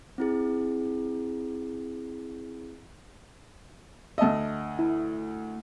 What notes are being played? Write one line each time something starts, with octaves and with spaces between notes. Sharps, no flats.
C4 E4 G#4
D2 D#5 E5 A5
E4